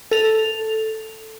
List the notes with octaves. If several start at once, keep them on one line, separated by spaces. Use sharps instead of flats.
A4 F7